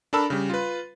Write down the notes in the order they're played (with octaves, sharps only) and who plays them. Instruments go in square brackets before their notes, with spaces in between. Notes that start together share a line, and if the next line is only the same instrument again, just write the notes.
[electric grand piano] D4 A4 A#4 A5 B5 E6
C#3 G3
F4 B4